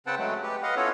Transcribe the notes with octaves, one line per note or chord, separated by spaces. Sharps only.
C#3 C4 B4 F#5 G5 A5
F#3 G#3 A3
G4 B4
B4 D#5 F5 F#5
B3 C#4 E4 F4 A4 C#5